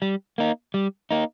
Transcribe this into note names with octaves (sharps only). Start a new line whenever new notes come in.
G3
A#3 D#4
G3
A#3 D#4